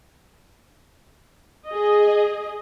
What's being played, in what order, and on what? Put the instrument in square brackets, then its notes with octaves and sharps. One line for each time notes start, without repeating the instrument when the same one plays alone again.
[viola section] G#4 D#5